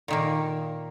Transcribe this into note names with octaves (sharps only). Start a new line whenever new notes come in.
A#2 D#3 A#3